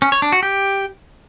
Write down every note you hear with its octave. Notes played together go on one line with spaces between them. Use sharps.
C#4
C#5
D4
F#4
G4